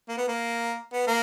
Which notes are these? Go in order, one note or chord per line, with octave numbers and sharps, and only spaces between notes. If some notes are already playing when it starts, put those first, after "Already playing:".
A#3
B3
A#3
B3
A#3